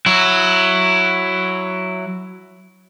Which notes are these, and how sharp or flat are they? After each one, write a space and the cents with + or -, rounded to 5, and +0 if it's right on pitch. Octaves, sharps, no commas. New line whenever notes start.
F#3 +0 E4 +10